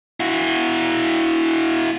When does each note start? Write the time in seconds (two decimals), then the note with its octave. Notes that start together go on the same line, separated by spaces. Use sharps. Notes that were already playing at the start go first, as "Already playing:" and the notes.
0.20 E4 F#4